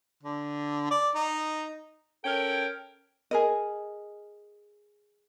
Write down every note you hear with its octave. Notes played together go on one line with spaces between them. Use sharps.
D3
D5
D#4
C#4 A4 A#4 G5
G#4 A#4 D#5